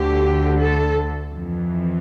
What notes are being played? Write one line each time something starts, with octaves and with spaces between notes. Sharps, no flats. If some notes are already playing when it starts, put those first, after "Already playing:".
Already playing: D2 D3 G4
A4
F2 E3